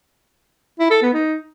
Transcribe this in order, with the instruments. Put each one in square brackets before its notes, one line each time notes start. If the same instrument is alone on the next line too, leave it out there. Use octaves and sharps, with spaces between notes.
[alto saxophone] E4
A4
B3
D#4